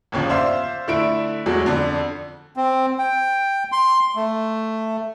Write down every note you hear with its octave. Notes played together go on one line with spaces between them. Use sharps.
G1 D#2 C#3 F3
C5 D5 E5 F5 C6
D3 A3 E4 E5 D7
E2 F#3 G#3 A3
F2 D3
C4
G5
C6
A3